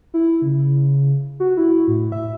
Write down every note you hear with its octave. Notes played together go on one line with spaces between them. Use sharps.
E4
C#3
F#4
E4
A2
E5